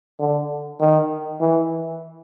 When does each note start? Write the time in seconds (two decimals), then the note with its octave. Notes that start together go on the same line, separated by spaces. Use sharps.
0.20 D3
0.80 D#3
1.40 E3